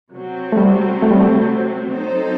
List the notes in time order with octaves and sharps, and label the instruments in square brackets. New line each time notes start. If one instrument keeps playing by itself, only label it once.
[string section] C3 F#3 C4
[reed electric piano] A3
G3
A3
G3
A3
[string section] F#3 C4 D#4 A4 C5